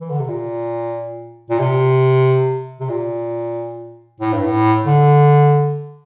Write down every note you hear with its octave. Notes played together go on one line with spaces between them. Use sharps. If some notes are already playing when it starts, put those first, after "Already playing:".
E3
D3
C3
A#2
A#2
C3
C3
A#2
A2
G2
A2
D3